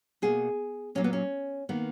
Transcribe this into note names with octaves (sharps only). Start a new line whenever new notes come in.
B2 A#3 G#4
A#2 F#3 A#3 C#4
B3
C#4
D#3 A#3 B3